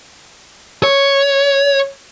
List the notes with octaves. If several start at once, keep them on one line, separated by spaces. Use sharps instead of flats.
C#5